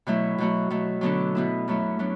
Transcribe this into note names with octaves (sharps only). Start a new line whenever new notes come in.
B2 F#3 A3 E4
B2 F#3 A3 F#4
B2 F#3 A3 E4
D3 F#3 B3 D4 A4
B2 B3 E4
F#2 F#3 A3 E4
F#3 B3 D4